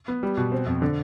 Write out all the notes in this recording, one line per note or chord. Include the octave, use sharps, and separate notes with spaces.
B3
G3
B2
C4
F2
D3